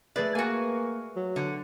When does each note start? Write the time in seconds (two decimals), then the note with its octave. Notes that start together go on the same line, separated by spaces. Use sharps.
0.16 A3 G#4 B4 D5
0.35 A#3 F#4 G#5
1.16 F#3
1.36 D3